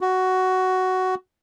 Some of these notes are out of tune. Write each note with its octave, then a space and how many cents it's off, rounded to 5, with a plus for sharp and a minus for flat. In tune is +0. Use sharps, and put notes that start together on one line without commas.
F#4 +10